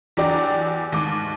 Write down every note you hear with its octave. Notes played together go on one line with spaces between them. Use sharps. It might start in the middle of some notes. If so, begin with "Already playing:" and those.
E2 F#3 D4 G4 D5 A#5
D#2 G#2 D6